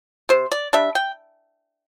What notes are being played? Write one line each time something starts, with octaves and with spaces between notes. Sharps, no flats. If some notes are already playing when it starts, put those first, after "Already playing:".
C3 C5
D5
G3 D4 E5
G5